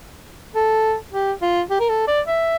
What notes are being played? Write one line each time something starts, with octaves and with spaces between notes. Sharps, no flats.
A4
G4
F4
G4
A#4
A4
D5
E5